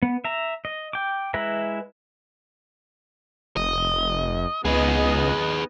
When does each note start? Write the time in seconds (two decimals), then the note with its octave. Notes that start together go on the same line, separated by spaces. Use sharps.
0.03 B3
0.24 E5 A#5
0.65 D#5
0.93 G5 D6
1.34 G#3 E4 B4 E5 A#5
3.57 F1 D#5
4.65 C#2 B3 D#4 G#4 B4 D#5